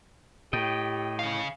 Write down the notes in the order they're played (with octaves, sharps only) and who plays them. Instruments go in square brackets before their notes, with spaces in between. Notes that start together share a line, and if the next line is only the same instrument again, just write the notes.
[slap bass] A2 [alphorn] G4 [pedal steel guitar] D#5 G5
[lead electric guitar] C#3 F5